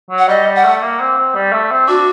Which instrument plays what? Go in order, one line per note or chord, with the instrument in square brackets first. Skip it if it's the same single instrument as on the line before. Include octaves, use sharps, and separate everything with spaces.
[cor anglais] F#3
[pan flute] F#5
[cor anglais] G3 [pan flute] D#5
[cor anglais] G3
[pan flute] F#5
[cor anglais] A3
A#3
C4
C4
G3
A3
C4
[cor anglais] D4 [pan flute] F#4